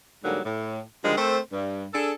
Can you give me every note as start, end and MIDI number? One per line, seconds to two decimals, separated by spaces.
0.24 0.40 44
0.24 0.40 50
0.24 0.40 54
0.24 0.40 55
0.24 0.40 58
0.45 0.81 45
1.04 1.13 50
1.04 1.13 51
1.04 1.13 53
1.04 1.13 55
1.04 1.13 56
1.17 1.39 57
1.17 1.39 60
1.17 1.39 69
1.17 1.39 70
1.17 1.39 72
1.53 1.85 43
1.93 2.13 62
1.93 2.13 68
1.93 2.13 69